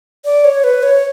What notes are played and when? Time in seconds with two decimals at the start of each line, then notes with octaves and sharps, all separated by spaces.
0.25 D5
0.44 C#5
0.64 B4
0.83 C#5